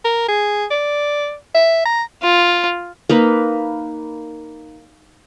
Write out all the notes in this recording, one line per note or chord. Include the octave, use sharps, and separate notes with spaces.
A#4
G#4
D5
E5
A#5
F4
A#3 D#4 B4